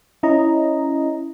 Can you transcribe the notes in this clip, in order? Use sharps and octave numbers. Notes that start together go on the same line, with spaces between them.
C#4 E4 D#5 A#5